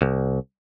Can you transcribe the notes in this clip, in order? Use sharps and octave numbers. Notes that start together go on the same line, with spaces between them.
C2